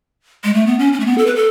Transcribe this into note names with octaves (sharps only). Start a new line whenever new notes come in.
G#3
A3
B3
C#4
C#4
A3
B3
A4
B4
A4